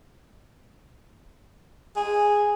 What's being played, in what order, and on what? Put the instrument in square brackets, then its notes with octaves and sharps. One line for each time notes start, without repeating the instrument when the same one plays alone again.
[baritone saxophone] G#4